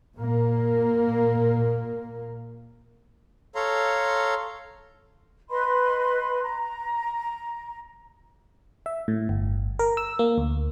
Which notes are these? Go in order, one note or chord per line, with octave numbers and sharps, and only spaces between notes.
A#2 A#3
A4 C#5 F5 A#5 C6
B4 D#5 B5 C6
A#5
E5
A2
G1
A#4
E6
A#3
D2